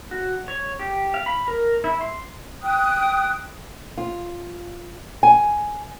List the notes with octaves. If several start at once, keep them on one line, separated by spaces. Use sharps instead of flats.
F#4
C#5
G4
F5
B5
A#4
E4
C6
G5 D#6 F#6
F4
G#5